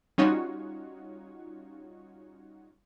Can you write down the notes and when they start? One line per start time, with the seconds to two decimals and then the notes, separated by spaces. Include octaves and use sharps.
0.18 G3 C#4 D#4 F4 F#4 C#5